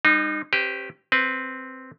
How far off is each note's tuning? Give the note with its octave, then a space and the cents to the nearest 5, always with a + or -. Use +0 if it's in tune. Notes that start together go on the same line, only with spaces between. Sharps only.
G3 +40 D#4 -25
C#4 -40 G4 +0 B4 +35
C4 +0 B4 +5